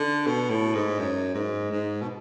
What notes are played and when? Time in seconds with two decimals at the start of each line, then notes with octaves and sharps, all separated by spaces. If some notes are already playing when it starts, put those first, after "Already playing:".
Already playing: D3
0.27 B2
0.50 A2
0.75 G#2
0.99 F#2
1.35 G#2
1.71 G#2
2.01 B2